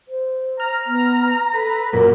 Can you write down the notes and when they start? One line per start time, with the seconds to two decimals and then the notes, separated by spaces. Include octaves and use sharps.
0.08 C5
0.60 A#5 F6
0.86 B3
1.54 A4 B4
1.93 F#2 A#2 A#4